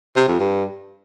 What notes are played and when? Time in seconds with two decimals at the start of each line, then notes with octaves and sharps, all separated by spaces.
0.16 C3
0.28 F2
0.40 G2